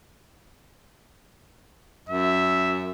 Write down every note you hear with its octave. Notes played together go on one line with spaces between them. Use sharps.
F#2 E5